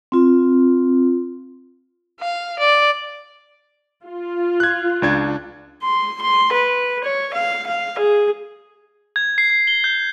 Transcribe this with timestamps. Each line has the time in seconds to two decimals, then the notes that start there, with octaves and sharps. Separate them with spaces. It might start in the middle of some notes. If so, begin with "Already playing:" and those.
0.12 C4 F4
2.20 F5
2.59 D5
4.06 F4
4.60 F#6 G#6
5.02 C#2 D4 G#6
5.83 C6
6.21 C6
6.53 B4
7.04 C#5
7.34 F5
7.66 F5
7.98 G#4
9.16 G#6
9.38 C7
9.50 C7
9.67 G7
9.84 G6